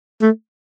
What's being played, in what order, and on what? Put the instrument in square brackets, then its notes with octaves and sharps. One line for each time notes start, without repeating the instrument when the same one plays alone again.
[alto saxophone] A3